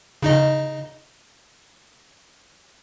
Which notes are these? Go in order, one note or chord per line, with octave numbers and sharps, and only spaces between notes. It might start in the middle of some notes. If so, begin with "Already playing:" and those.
C#3 D#4 D#5